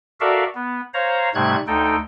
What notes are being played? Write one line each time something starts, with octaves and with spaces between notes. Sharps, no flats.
F#4 A4 A#4 D5 E5 F5
B3
C5 C#5 F5 A#5
G#2 C3 G3 A3 F#6 G#6
D2 D#4 A4 G5